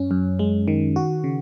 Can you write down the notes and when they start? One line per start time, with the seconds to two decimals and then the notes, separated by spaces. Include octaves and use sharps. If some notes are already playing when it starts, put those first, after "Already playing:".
Already playing: F#2 C#4
0.11 F#2
0.39 G#3
0.68 D#3
0.96 F#4
1.24 C#3